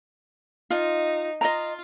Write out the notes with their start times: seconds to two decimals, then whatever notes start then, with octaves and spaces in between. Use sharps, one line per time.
0.70 D#4 F4
1.41 F4 D#5 A#5